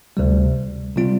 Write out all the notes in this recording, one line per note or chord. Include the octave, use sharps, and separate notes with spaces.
D2 C3 G3
C3 G3 C4 F4